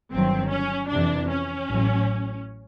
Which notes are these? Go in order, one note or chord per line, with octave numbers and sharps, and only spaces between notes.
G1 G2 D#3 F#3 C4
C#4
F2 C3 E3 D4
C#4
A1 A2 F#3